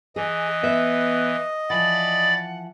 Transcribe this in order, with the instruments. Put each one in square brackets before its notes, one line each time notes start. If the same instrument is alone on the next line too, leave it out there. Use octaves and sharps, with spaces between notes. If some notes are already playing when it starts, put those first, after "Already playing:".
[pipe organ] E3 [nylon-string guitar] G#4 [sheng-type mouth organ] D#5
[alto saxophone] B3 [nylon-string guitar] E5
[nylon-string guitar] E3 F3 [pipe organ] D5 B5 A6 [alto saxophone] F#5